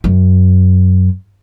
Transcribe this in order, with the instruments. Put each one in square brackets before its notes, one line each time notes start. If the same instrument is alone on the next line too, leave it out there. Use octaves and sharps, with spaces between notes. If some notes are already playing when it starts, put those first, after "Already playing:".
[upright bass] F#2